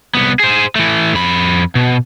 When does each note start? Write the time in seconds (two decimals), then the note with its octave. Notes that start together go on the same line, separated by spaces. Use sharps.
0.15 C2 B3
0.40 G#4 C5
0.76 E3 A3
1.14 F2 B5
1.75 B2